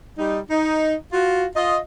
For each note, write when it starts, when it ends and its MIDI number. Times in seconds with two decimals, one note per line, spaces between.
0.17 0.40 55
0.17 0.40 63
0.50 0.94 63
1.12 1.45 65
1.12 1.45 66
1.56 1.77 65
1.56 1.77 75